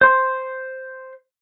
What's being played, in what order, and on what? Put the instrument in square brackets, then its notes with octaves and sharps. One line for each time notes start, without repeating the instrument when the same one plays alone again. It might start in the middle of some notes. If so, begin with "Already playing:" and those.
[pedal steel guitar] C5 C6